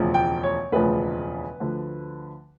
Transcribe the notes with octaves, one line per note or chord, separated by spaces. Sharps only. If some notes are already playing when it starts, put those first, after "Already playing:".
Already playing: E1 D2 C#3 F3
G5
C#5
E1 D2 C#3 F3 B4
D2 D3 F3